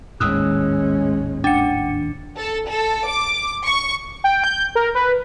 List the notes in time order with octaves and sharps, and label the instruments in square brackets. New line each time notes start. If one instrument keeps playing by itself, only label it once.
[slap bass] G#1 D#2 A2 [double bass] G#3 C#4 [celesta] D#6 E6 F#6
[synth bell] D4 C#7 [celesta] F#5 G5
[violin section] A4
A4
D6
C#6
[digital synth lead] G5
G6
A#4
B4